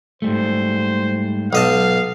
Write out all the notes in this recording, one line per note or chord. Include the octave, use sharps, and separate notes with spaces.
G#2 G3 A3 C5
B1 D#5 F5 A5